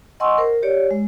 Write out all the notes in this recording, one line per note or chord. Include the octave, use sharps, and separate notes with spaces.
D#5 F#5 G#5 C6 C#6 E6
A#4 C5
G4 C#5 D5
G#3